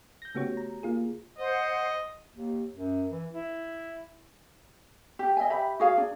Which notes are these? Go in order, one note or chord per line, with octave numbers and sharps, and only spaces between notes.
G6 A#6
C#3 A3 B3 F#4 G4 C#5
A#5
A#3 F4 G#4
C5 D#5 F#5
D#2
F#2
E3
E4
G4
D#5 E5 G#5
G4 E5 B5
F#4 G#4 F5
D4